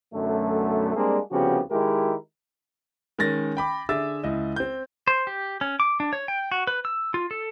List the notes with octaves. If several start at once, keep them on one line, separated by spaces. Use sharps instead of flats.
B1 F#2 D3 A3
G3 G#3 A#3 C4 D4 G#4
C2 C#3 F3 B3 F#4 G4
D#3 G#3 E4 G4 A#4
D#3 G#3 C#4 A6 A#6
G5 B5 D6
D3 G#4 E5 D6 E6 A6
C#2 E4 D#5
C4 G6
C5
G4
C#4
D6
D4
C#5
G5
F#4
B4
E6
F4
A4